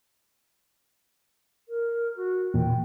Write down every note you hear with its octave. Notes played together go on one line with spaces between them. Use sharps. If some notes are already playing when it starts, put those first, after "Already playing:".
A#4
F#4
E2 A#2 G5